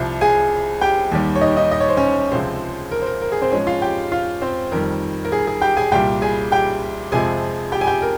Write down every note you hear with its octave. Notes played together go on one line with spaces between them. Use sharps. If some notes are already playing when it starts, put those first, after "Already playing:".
Already playing: C2 C3 F3
G#4 G#5
G4 G5
D#2 D#3 G3
C#5
D#4 D#5
D#4 D#5
D#5
C#5
C5
C#4 C#5
C#2 C3 F3 G#3 C4 C5
A#4
C5
A#4
A#4
G#4
C4 C5
G#2 F3 G#3 C#4 C#5
F4 F5
G4 G5
F4 F5
C4 C5
F2 D#3 G3 A#4
A#4
G#4
G#4
G4 G5
G#4 G#5
C2 A#2 G3 G4 G5
G#4 G#5
G4 G5
F2 C3 F3 G#3 G#4 G#5
G4 G5
G#5
G4 G5
A#4